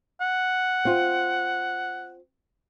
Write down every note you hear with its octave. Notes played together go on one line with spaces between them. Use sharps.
F#5
C4 F4